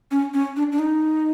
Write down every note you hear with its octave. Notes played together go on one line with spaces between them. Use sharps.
C#4
C#4
D4
D4
D#4